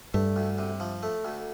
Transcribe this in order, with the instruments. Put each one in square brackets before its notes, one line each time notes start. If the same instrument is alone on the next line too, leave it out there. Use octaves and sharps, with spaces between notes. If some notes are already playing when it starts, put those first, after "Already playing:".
[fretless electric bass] G2 [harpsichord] A3
[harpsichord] D2
C3
F3
A3
D2